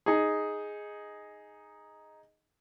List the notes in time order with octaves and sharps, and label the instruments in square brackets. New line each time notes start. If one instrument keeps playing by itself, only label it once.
[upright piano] D#4 G#4